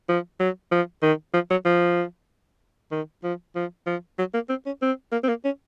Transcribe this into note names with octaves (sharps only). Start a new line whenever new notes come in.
F3
F#3
F3
D#3
F3
F#3
F3
D#3
F3
F3
F3
F#3
A#3
C4
C#4
C4
A#3
C4
A#3
C#4